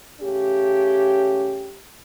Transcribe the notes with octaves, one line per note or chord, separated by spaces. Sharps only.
C#3 A3 C#4 G4